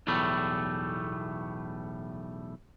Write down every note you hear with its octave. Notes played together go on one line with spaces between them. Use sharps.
B1 E2 A2 G3 A3